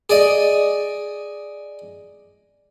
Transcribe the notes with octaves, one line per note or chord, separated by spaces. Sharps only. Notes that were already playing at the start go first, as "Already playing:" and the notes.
G#4 D5 D#5